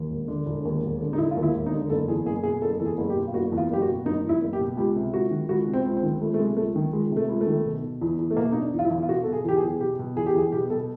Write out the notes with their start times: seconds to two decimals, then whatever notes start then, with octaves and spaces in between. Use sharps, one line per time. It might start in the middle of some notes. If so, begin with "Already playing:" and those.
Already playing: D#2
0.10 E1
0.28 D3
0.46 E1
0.65 D#2
0.83 E1
1.01 D3
1.13 D#4
1.18 E1 E4
1.31 F4
1.37 D#2
1.43 E4
1.55 E1
1.66 D#4
1.73 D3
1.90 F#1 A4
2.08 E2 G#4
2.26 F#1 G#4
2.43 B2 G#4
2.62 F#1 A4
2.80 E2 A4
2.86 G#4
2.98 F#1
3.10 G4
3.16 B2
3.27 F4
3.34 F#1 F#4
3.52 E2
3.57 F4
3.70 F#1 G4
3.82 F#4
3.87 B2
4.05 F#1 D#4
4.23 E2
4.29 E4
4.42 F#1
4.53 G4
4.60 B2
4.77 C#2 G4
4.96 C3
5.14 C#2 F#4
5.31 D#3
5.49 C#2 F#4
5.67 C3
5.73 C4
5.86 C#2
5.97 C4
6.03 D#3
6.21 C#2 A3
6.34 A3
6.39 C3 G#3
6.57 C#2 A3
6.76 D#3
6.93 C#2 G#3
7.11 C3
7.17 A3
7.29 C#2
7.41 A3
7.47 D#3
7.65 B2
7.83 B2
8.01 E2
8.18 E2
8.31 A3
8.37 B2 A#3
8.52 B2 D#4
8.60 D4
8.73 E2
8.79 F4
8.85 E4
8.90 E2
9.03 F4
9.09 B2 F#4
9.24 B2 A4
9.33 G#4
9.44 E2 G4
9.57 G#4
9.63 E2
9.80 B2 G4
9.99 B2
10.16 E2 G#4
10.26 G4
10.35 E2 G#4
10.52 B2 G4
10.70 B2 A4